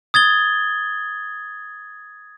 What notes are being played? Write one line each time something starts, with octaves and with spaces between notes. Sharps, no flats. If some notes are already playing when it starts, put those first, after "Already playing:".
D#6 G#6 A6 G7